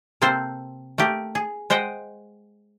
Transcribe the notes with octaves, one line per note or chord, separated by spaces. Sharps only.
C3 A#3 C4 A4 C5
A3 A#3 G4
G#4
G#3 C5 D#5 F#5 G5